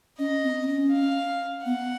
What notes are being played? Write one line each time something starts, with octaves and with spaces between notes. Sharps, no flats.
C#4 D#5
C4
C4
C#4
F5
B3 F#5